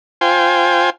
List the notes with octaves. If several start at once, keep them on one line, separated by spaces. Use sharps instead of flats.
F4 C5 G5 G#5